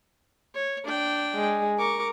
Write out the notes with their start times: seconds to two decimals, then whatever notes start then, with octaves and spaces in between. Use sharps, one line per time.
0.54 C#5
0.84 D4 G5
1.34 G#3
1.78 A#4 C#6 D6